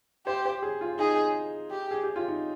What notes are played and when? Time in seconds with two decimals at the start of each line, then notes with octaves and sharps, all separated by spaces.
0.26 G4 C5
0.45 C5
0.62 G#4
0.81 F4
0.99 D#4 G#4
1.71 G4
1.91 G#4
2.03 G4
2.16 F4
2.28 D#4